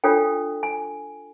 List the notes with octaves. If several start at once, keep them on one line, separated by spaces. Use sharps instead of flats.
D4 F4 A4 C#5 G5
G#5